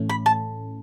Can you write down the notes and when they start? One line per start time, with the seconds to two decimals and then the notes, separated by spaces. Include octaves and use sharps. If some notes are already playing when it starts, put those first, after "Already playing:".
Already playing: A2 E3 A3 C#4
0.09 B5
0.26 A5